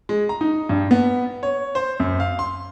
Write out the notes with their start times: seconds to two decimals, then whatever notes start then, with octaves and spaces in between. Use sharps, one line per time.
0.09 G#3
0.29 A#5
0.41 D#4
0.69 G2
0.91 B3
1.43 C#5
1.75 C5
2.00 F#2
2.20 F5
2.39 C6